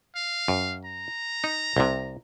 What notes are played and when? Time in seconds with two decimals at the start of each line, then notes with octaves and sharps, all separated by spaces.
0.16 F5
0.48 F#2
0.85 A#5
1.44 D#4
1.77 C2 C3